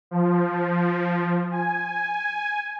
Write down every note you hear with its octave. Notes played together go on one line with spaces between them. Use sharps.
F3
G#5